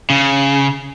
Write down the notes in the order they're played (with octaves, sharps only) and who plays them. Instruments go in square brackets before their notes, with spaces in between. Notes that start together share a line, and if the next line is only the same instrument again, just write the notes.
[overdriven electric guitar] C#3